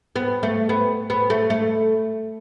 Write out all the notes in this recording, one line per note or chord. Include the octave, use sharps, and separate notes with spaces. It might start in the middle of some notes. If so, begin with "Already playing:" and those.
B3
A3
B3
B3
A3
A3